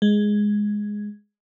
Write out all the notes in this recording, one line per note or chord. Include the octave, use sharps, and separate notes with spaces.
G#3